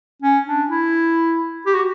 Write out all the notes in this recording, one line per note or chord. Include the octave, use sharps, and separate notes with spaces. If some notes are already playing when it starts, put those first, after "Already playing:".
C#4
D4
E4
G4
F#4